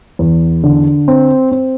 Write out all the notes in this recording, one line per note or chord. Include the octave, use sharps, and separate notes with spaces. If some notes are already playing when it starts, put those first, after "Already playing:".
E2
D3
C4
C4